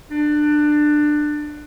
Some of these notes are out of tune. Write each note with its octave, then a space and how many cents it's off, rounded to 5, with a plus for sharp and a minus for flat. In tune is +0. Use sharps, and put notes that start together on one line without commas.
D4 +20